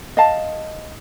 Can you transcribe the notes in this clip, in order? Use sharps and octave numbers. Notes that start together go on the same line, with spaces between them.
D#5 F5 A5